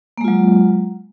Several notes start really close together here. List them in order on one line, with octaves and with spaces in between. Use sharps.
A#3 G#3 F4 F#3